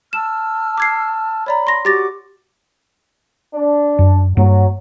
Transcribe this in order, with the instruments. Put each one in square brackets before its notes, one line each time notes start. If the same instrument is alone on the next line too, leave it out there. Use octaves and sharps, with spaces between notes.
[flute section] A5 E6 F6 [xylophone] E7
[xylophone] D6 G#6 C7
[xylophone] C#5 D5 A#5 [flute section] B5
[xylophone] C6 A#6
[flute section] F#4 D6 [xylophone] G4 A6 A#6
[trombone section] D4
[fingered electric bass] F#2
[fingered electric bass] G2 A#3 [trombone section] F#3